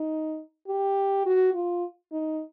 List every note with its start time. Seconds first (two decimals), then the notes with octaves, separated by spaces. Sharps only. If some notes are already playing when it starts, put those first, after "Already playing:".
Already playing: D#4
0.68 G4
1.25 F#4
1.54 F4
2.12 D#4